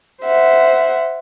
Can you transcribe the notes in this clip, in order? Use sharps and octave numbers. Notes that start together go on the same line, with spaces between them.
C5 E5 F#5